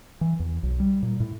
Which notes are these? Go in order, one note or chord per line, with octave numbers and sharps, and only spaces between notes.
E3
E2
B1
G3
A#2
A2